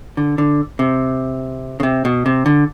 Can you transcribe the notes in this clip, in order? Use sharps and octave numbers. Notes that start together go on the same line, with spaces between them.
D3
D3
C3
C#3
C3
B2
C3
D3